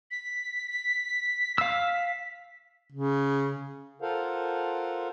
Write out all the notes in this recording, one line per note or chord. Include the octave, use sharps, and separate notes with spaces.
B6
F5 E6
C#3
F4 A4 A#4 C5 F5 F#5